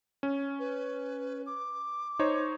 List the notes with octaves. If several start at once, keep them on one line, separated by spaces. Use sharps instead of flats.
C#4
B4
D6
D#4 C5 C#5